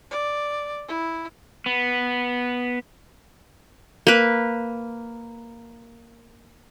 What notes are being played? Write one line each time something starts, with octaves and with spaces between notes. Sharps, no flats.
D5
E4
B3
A#3 B4